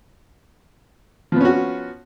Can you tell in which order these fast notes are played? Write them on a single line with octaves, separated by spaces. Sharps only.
F3 B3 C#4 F#4